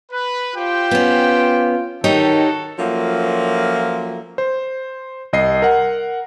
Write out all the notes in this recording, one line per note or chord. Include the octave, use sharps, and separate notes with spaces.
B4
F4 G4 C5 G5
B3 C#4
D#3 D#4 F#4 G4 A4 C#5
F3 F#3 A3 A#3 C#4 F4
C5
C2 D#5 C7
A#4 F#5